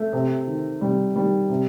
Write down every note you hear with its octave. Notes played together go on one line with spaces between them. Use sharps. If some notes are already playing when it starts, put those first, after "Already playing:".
Already playing: A3
C3
D#3
C3 G3
D#3 G3
C3